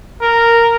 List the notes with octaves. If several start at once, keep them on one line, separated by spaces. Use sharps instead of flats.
A#4